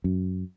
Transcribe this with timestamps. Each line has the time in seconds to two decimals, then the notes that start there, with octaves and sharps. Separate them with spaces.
0.04 F#2